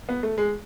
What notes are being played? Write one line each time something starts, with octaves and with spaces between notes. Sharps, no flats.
B3
A3
G#3